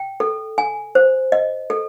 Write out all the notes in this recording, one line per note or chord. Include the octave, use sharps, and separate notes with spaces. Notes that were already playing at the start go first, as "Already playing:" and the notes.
Already playing: G5
A4
G#5
C5
D#5
A4